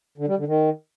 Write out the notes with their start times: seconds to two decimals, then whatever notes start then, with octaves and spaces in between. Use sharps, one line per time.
0.18 D3
0.28 G3
0.38 D3
0.47 D#3